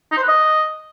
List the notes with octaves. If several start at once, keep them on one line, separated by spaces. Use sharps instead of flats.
D#4
C5
B4
D#5